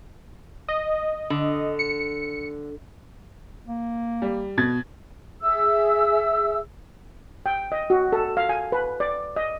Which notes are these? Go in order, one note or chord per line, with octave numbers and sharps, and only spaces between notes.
D#5
D3
C#7
A#3
G3
B2 G#6 A6
G#4 E5 E6
G5
D#5
F#4
A4
F5
G#5
B4
D5
D#5